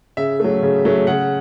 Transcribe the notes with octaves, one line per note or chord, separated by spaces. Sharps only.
C#3 E5
F#3 A3
C#3
F#3 A3
C#3 F#5